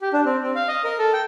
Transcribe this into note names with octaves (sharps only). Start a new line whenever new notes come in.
G4
D4
C4
C4
F5
D#5
A#4
A4
G5